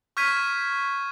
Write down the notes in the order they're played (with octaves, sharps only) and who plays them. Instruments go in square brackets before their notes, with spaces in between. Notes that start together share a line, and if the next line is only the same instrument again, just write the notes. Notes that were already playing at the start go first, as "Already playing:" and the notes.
[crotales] C#6 F6 G6 G#6 B6 D#7